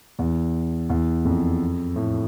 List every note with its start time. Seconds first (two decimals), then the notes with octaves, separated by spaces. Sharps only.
0.19 E2
0.90 E2
1.25 F2
1.96 A2